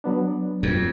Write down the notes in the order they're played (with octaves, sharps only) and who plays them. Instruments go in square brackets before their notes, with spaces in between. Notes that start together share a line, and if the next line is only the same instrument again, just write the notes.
[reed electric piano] F#3 B3 D4
[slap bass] F2